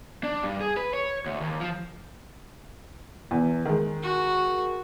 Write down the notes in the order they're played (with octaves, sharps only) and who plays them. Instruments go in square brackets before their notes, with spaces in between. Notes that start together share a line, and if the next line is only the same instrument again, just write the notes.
[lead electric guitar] D4
G2
G#4
B4
C#5
D2
D#2
F3
[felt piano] E2
D#3 G#3
[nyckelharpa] F#4